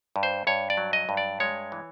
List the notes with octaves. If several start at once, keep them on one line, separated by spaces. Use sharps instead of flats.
G2
C5
G2 C#5
D5
F#3
D#5
G2
D5
G#3 C#5
E3